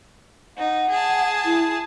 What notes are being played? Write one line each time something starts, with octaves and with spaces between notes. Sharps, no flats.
D#4 F#5
G#4 A5
E4